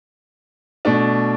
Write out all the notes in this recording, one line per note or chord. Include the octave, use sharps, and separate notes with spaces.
B2 A3 D4